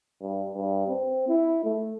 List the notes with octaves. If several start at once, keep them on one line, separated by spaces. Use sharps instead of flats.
G2
G2
C4
E4
A3